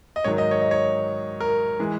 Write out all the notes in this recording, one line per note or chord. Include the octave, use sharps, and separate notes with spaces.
D#5
G#2 D#3 F#3 C#5
D#5
C#5
D#5
C#5
A#4
E3 G#3